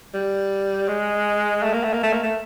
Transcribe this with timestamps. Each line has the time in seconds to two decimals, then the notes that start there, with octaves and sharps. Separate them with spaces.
0.14 G3
0.88 G#3
1.63 A3
1.73 A#3
1.83 A3
1.93 A#3
2.03 A3
2.13 A#3
2.23 A3